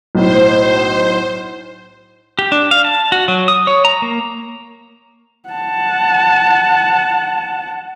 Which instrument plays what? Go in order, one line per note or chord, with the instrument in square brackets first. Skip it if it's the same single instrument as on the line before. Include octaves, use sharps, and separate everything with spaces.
[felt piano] B1 A2 [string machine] C5
[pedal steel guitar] G4
D4
F5
A5
F#4
F#3
D#6
C#5
A#5
A#3
[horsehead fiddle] F#5 A5